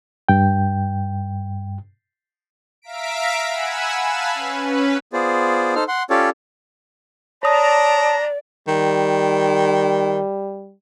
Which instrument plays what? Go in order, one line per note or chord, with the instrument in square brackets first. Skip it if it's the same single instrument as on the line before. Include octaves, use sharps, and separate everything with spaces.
[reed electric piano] G2 G5
[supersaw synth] E5 F5 A#5 B6 D7
F#5 G#5 B5 E6
F5 G#5 A5 B5 E6 F#6
C#4 B4
[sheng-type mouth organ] B3 F4 G#4 C5 D5
D#4 A4 C5 F6
F#5 C6
C#4 F4 G4 A4 C#5 D5
[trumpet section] D4 A#5 [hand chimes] C#5 D#6 [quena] D5 [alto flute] A5
[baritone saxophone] D#3 [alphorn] G3